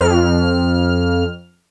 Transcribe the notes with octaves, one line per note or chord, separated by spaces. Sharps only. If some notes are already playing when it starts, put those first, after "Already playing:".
F2 F6